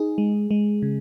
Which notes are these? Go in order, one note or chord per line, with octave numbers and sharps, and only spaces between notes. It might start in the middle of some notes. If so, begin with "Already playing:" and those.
Already playing: D#4 G#4
G#3
G#3
C#3